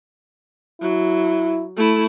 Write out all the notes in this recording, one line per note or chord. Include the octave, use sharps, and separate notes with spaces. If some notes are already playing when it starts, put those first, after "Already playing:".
F#3 E4
A3 E4